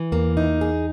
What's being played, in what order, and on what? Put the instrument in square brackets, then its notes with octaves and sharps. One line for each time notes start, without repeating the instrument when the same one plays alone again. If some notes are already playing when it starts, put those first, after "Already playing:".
Already playing: [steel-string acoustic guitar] E3
[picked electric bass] E2 [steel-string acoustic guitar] A#3
[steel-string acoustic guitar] D#4
G#4